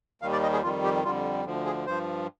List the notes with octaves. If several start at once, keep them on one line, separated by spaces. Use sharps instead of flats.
D#2 D#3 G3 F5
D5
D#5
G#4
F2 D#3 G3 F4
G4
F2 D3 G3 F4
D2 D3 F3
G#4
G2 F3 C5